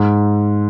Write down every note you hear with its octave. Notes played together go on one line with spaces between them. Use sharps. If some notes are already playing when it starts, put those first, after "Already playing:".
Already playing: G#2